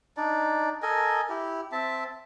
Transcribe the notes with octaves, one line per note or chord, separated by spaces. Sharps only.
D4 D#4 D5
A4 A#4 D#5 G#5
E4 G4
C4 E5 A5